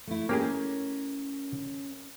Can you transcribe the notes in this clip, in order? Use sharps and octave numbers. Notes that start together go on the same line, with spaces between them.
A3 E4
A#3 C#4 G4 G#4 A#4